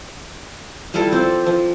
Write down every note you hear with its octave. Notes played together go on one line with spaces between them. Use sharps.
G3 E4 F4 A4
F3 C4 D5
F3